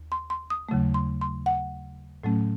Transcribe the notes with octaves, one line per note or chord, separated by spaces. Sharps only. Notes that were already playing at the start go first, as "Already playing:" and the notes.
Already playing: D#2
C6
C6
D#6
D#2 C#3 F#3 A3
C6
C6
F#5
A2 F#3 A3 C#4